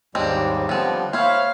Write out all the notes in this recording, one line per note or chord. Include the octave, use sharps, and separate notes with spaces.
D#2 G#2 G3 G#3 C4 D4 C#5 D#5
D3 F3 G3 B3 C4
A#3 C5 C#5 E5 F5 B5 F6